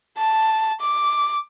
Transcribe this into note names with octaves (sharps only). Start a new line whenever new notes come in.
A5
D6